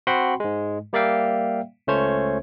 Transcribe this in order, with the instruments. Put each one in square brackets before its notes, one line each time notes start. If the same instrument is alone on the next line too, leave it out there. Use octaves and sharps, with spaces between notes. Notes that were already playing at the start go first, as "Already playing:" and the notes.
[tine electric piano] C4 F#4 F#5 G5 B5 C6
G#2 G#3
G3 A#3 D5 E5 F5 G5
C#2 A3 C#4 C5 C#5 G#6